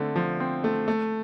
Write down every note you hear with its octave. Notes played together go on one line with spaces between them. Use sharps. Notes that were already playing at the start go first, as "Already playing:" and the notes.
Already playing: D3 A3 C4
F3
C4
A3
A3